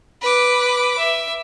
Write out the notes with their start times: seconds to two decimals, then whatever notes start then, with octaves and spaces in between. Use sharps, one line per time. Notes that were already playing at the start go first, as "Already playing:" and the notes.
0.22 B4 D6
0.98 E5